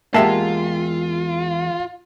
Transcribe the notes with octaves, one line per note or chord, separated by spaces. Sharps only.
E2 G#3 A#3 F4 G4 E5 A5